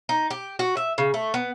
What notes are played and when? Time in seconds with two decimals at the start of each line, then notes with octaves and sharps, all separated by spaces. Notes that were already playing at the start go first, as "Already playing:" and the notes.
0.09 D#4
0.30 G4
0.59 F#4
0.77 E5
0.98 C#3
1.14 A3
1.34 B3